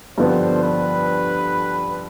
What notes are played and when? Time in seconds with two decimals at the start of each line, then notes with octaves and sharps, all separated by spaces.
0.17 G2 D3 F3 B3 D4 C5
0.63 B4